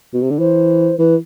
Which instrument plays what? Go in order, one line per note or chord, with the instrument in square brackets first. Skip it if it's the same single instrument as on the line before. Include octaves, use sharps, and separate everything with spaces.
[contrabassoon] B2
C3
D3
[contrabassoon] E3 [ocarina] C5
[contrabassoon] E3 [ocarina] B4